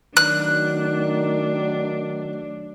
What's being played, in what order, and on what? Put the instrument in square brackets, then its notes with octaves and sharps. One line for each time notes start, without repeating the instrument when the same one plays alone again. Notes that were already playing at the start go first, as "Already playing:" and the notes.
[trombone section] D#3 F#3 [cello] A3 D4 [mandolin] F#6